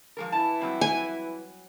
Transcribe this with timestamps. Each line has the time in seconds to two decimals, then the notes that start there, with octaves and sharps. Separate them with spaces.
0.17 F3 G#3 A#4
0.32 E3 E4 A5
0.60 F#3 G3 C4
0.81 G#5